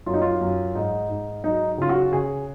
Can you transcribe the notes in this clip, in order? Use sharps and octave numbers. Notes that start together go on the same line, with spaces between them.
F#2 F4
D#4
F4
F#2
G#2 D#4
G#2
F#3 D#4
C#3 F4
F#4
C#3 G#4